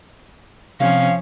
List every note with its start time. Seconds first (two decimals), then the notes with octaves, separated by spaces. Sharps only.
0.80 C3 F3 C#4 F5